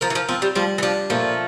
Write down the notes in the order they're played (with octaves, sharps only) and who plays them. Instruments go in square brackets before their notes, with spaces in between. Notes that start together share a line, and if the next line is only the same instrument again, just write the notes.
[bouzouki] F3 [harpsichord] A#4
[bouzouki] E3
F3
[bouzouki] F3 [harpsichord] C4
[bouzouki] G3
[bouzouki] F3 [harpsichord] G3
[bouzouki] E3
[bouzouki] F3 [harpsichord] D4
[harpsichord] A#2 [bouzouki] F3 A3